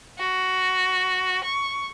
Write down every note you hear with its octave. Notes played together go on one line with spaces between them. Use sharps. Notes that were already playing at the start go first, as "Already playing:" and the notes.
F#4
C#6